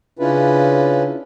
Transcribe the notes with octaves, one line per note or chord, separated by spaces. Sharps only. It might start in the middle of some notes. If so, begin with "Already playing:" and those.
C#3 C#4 D4 E4 F4 B4